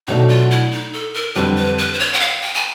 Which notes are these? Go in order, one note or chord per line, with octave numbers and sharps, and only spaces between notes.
B2 F#3 A3 D4 D#4
F4
E4
D#4
A4
A#4
F2 D3 G3 C4 B4
B4
B4
C5
C#5
F#5
F5
G5
G#5